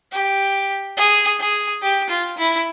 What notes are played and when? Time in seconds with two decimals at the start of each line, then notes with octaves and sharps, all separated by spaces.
0.12 G4
0.97 G#4
1.39 G#4
1.82 G4
2.10 F4
2.38 E4